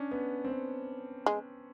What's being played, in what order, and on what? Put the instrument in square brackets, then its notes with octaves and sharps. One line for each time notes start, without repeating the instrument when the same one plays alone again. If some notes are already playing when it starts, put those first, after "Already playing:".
Already playing: [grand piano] C#4 D4
B3
C4
B3
[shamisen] G#3